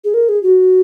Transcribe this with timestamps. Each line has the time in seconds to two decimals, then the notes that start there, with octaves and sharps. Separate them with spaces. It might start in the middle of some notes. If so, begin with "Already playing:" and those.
0.04 G#4
0.14 A#4
0.29 G#4
0.43 F#4